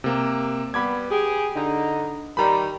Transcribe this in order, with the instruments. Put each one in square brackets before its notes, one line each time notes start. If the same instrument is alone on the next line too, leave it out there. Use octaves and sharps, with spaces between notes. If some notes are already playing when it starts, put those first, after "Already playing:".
[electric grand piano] C3 A#3
[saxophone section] G3 B3 [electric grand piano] B5 D6 G#6
[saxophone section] G4 G#4
D3 D#4
[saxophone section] D#3 G3 [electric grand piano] A#5 B5